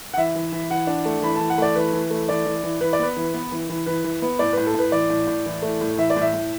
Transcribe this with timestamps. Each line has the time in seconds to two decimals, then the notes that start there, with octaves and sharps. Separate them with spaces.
0.14 F#5
0.17 E3 E5
0.35 E3
0.52 E3
0.70 E3 F#5
0.87 D4
1.05 A3
1.22 E3 B5
1.35 E3 A5
1.50 F#5
1.58 A3 D5
1.75 E3 B4
1.93 E3
2.10 A3
2.29 E3 D5
2.46 E3
2.63 E3
2.81 E3 B4
2.93 D5
2.99 B3 B4
3.16 E3
3.34 B3
3.52 E3
3.69 E3
3.86 E3 B4
4.04 E3
4.22 B3
4.39 A2 D5
4.53 A2 B4
4.67 A4
4.75 A2 B4
4.92 E3 D5
5.10 A2
5.27 A2
5.46 E3
5.62 A3
5.81 A2
5.98 E3 E5
6.10 D5
6.16 A2
6.21 E5
6.34 A2